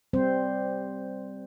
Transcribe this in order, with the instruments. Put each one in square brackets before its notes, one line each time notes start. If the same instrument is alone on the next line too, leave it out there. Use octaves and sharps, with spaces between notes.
[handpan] G3 C4 C5